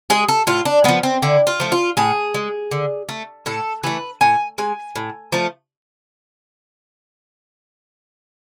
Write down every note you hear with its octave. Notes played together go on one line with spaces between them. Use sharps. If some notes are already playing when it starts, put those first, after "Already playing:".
G#3 G#4
A4
A2 F4
D4
F3 G#3 B3
C4
D3 E4
F4
F3 A3
F4
A2 G#4
G#3
D3
A3
A2 A4
E3 A3 B4
A2 G#5
G#3 G#5
A2
F3 A3